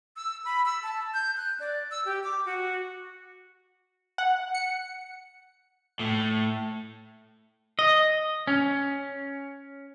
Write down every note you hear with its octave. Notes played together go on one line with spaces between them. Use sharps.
E6
B5
E6
A5
G6
F#6
D5
E6
G4
D6
F#4
F#5
C#7
A2
D#5
C#4